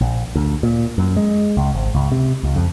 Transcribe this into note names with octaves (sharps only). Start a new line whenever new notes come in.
A#1
D2
A#2
F#2
G#3
C#2
G#1
C#2
C3
C#2
F2